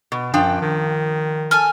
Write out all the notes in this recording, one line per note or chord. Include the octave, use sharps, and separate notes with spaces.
B2
F#2 F3 D4 G5
D#3
A4 G#5 F6